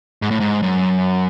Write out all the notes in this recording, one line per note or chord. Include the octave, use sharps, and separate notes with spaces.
G#2
A2
G#2
F#2